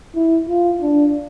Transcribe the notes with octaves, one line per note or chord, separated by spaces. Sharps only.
E4
F4
D4